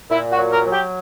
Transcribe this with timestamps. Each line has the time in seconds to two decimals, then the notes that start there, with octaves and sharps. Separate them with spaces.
0.10 A#2 E4
0.31 F#4
0.38 F#3
0.52 A#4
0.66 F#3
0.73 G4